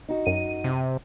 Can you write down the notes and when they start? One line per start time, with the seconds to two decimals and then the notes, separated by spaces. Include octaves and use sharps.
0.09 D#4 F#4
0.26 F#2 D#7
0.64 C3